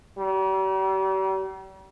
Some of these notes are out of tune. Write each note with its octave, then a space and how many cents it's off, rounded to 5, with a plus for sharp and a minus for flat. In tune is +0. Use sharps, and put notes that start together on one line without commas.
G3 -40